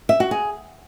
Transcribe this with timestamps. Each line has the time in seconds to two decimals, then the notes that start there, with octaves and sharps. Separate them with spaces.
0.09 E5
0.20 F#4
0.31 G#4